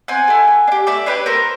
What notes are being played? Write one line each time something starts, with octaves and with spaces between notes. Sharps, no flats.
C4 F#5 G#5
E4 A4
A3
D4
G4
A3 D5 E5
D4 G4 B4 C#5
A3 A#4 C5